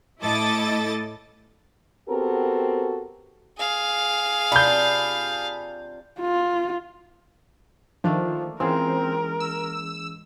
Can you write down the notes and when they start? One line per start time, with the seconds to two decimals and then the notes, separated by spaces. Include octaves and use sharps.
0.22 A2 E4 A4 D#5 D6 A6
2.08 B3 C4 F#4 G4 A4 A#4
3.58 G#4 F5
4.52 C3 D4 F4 B5 G6
6.20 F4
8.04 D#3 F3 A3 A#3 D4
8.60 E3 G#3 C4 C#4 F4 G#4 A#4
9.40 E6